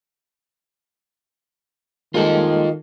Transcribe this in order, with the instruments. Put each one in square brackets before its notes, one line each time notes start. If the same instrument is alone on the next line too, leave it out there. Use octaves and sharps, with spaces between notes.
[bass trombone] D#3 [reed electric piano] G3 G#3 A#3 [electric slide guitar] F4 A4 [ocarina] D#5